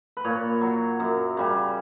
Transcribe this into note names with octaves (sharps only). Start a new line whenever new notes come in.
B4
A#2 C#5
F#3
F#2
C#3 G3